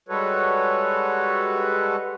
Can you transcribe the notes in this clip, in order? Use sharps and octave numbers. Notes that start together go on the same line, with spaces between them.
G3 G#3 F#4 A4 B4 C#5